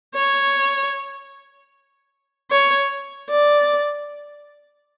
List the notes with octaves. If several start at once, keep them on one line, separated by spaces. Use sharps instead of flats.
C#5
C#5
D5